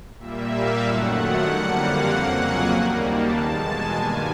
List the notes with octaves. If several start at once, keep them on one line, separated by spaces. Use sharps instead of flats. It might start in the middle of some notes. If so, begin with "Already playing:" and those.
A#2 G3 A#3 E5
F5
F#2 D#3 F#3 A3 F#5
F2 D3 G3 A#3 F#5
F5
F2 C#3 F#3 A#3 F#5
G#5
D#2 D#3 G3 A#3
A5
E2 B2 G#3
G#5
G2 D#3 G3 A#3